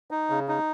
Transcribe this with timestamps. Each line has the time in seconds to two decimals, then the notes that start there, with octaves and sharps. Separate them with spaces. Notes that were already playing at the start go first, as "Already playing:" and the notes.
0.11 D#4
0.30 C#3
0.48 D#4